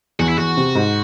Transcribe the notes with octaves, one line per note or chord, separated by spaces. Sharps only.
E2 F#4
E4
E2 F#4
C3
G#2